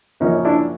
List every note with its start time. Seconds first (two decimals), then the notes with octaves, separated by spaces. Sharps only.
0.20 F#2 C#3 F3 A#3 C#4 D#4
0.45 D4 E4